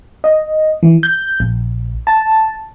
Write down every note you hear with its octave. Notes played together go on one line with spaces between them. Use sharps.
D#5
E3
G6
A#1
A5